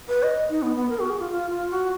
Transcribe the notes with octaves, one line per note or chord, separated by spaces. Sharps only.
B4
D#5
D#4
B3
B3
A#4
F#4
G#4
F4
F4
F4
F#4